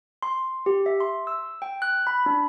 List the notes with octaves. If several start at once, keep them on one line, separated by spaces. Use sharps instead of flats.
C6
G4
E5
C6
E6
G5
F#6
B5
D4